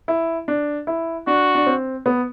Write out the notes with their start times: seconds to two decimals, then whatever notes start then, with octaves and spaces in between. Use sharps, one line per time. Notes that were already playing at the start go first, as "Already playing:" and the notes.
0.08 E4
0.48 D4
0.87 E4
1.27 D4 F#4
1.55 D4
1.67 C4
2.06 B3